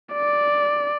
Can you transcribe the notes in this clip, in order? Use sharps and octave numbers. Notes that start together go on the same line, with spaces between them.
D5